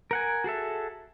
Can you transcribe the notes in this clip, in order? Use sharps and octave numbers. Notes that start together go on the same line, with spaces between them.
A#4 F#5 G#5
F#4 G#4 A4 E5